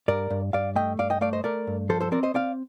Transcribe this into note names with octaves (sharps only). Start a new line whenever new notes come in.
G2 A#4 D5
G2
G2 D5 F5
A3 D#5 G5
G2 D5 F5
D#5 G5
A3 D5 F5
C5 D#5
A3 A#4 D5
G2
F3 A4 C5
A4 C5
C4 A#4 D5
C5 D#5
C4 D5 F5